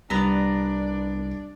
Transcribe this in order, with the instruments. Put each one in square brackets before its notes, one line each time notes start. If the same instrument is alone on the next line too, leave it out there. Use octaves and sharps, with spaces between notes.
[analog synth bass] C2 [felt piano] G3 [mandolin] B3 A#5 [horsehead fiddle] D4 D5